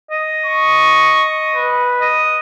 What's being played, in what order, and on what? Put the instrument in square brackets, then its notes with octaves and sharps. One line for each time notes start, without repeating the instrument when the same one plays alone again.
[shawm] D#5
[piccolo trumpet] C#6
B4
[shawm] D#5